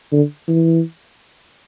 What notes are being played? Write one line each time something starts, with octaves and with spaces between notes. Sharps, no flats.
D3
E3